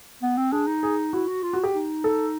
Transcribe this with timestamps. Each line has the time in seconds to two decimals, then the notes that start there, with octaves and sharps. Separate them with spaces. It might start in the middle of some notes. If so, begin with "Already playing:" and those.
0.22 B3
0.37 C4
0.52 D4 G#4
0.67 D#4
0.83 G#4
1.13 E4 F#4
1.28 F#4
1.43 F4
1.53 F#4
1.64 G4
1.73 D#4
2.04 A4